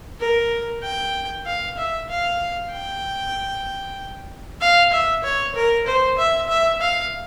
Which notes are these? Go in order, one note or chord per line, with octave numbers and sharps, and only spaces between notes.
A#4
G5
F5
E5
F5
G5
F5
E5
C#5
A#4
C5
E5
E5
F5